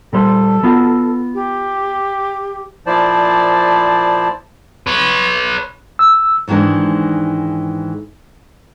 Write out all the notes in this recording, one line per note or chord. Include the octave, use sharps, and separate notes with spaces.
A#2 G3 A4 C5
B3 F4 F#4
G4
A#2 F3 E4 C5 D5 A5
B4 C#5
E6
G#2 D#3 E3 G#3 D4